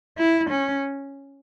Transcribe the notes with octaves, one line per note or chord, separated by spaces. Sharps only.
E4
C#4